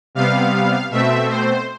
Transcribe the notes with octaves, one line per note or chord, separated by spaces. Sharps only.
C3 G3 B3 F5
B2 A3 C4 E5
C5